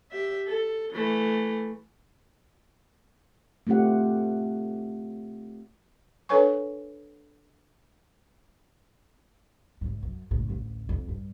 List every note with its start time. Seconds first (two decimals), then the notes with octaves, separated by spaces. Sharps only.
0.12 G4 E5
0.48 A4
0.94 E3 A3
3.67 A3 C4 F4 G4 F#5
6.29 D4 A4 B4 C#5 G#5 C#6
9.81 D2 G#2
10.03 F#2
10.31 F#1 A2
10.49 A1 D2
10.89 F2
11.08 G2